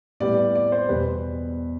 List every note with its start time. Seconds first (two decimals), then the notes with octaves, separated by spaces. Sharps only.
0.20 A2 G3 B3 E4 D5
0.38 D5
0.55 D5
0.72 C5
0.89 E2 B2 G3 B4